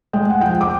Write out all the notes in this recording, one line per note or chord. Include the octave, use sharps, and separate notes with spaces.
G#3 G5
F#5
F3 G5
D6